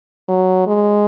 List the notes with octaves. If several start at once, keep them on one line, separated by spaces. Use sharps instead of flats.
F#3
G#3